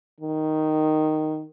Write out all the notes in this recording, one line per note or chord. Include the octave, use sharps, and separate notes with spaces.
D#3